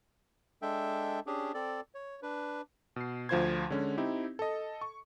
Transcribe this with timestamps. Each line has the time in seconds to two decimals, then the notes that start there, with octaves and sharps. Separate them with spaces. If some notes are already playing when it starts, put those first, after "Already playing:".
0.62 G#3 D4 A4 E5 G5
1.27 C#4 D4 G4 G#4
1.54 C4 A4 D5
1.95 C#5
2.23 D4 B4
2.96 B2 C7
3.29 D2 F3 F4 C5 C6 G#6
3.70 D3 G#3 C#4
3.97 C4 D#4 E4 G4
4.39 A4 D#5
4.81 C#6